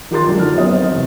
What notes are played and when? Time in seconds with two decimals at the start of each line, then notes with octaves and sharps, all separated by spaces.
0.11 D#3 F4 G4 A#4 C6 A6
0.26 F#2 D3 G#3
0.39 F#3 D#4 F4 A#4 F6
0.54 F#2 A#3 B3 G4 D#5
0.70 F#3 C4 C5
0.90 E2 C3